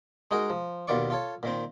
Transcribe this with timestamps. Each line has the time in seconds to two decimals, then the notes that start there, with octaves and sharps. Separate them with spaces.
0.31 G#3 D#4 F#4 G#4 A#4
0.50 F3
0.88 D#2 B2 D#3 F4 D5 C#6
1.10 F4 A4 C#5
1.43 A#2 D#3 C4